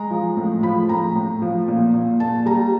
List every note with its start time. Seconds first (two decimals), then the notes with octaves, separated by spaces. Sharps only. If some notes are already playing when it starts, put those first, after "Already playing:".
Already playing: G#3 A#5
0.11 F3
0.37 A2
0.63 F3 B5
0.89 A2 A#5
1.15 A2
1.42 F3
1.68 A#2
1.94 A#2
2.20 A#2 A5
2.46 G3 A#5